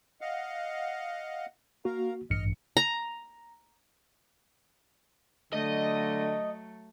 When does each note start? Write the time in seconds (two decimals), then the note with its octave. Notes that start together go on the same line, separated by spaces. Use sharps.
0.21 D#5 F5 F#5
1.85 A#3 F#4 A#4 F5 A#5
2.30 A1 G2 D#5 F6 C#7
2.77 A#5
5.53 D3 F#3 A3 D#5